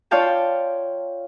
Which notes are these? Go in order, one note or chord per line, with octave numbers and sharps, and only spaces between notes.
F4 C#5 D5 F5 G5 A5